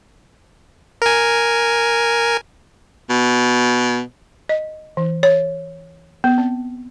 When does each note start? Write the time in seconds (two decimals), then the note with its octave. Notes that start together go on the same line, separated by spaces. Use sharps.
1.02 A#4 G#5
3.10 B2
4.49 D#5
4.97 E3
5.23 C#5
6.24 B3
6.38 C4